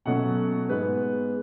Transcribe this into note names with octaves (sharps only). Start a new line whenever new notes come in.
B2 F#3 A3 C#4 F#5
G#2 G#3 B3 B4